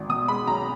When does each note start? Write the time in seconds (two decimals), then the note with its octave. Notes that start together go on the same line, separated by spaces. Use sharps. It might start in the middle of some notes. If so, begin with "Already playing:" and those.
Already playing: G#1
0.09 B2 D#6
0.28 G#3 B5
0.47 B1 A#5